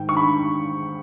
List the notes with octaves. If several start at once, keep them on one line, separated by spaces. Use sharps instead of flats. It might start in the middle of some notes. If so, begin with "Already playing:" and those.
Already playing: G#2 D#3 G5
C#6
B5